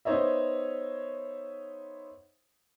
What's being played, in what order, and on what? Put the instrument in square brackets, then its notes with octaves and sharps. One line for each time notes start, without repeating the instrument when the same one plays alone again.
[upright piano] B3 D#4 C5 C#5 D#5 E5